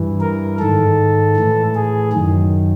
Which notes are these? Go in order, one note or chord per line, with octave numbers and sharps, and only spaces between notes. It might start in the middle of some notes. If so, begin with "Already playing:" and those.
Already playing: G2 E3
A#4
G#2 D#3 A4
A2 E3
G#4
F#2 D#3